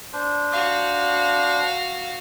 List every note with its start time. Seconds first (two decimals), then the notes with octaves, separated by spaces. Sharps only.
0.13 D4 C5
0.51 F#4 F5